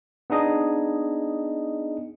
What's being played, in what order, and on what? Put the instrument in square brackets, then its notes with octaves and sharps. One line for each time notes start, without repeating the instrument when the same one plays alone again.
[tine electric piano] B3 D4 D#4 G#4 D#5